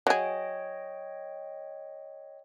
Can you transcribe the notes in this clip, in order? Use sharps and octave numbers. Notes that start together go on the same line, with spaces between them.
F#3 G#4 C#5 D#5 G5